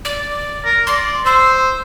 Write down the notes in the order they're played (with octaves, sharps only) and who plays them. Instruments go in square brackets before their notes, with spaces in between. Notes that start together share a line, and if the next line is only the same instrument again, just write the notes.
[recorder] D5
[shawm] A#4
[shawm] D5 [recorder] C6
[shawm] C5 [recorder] E6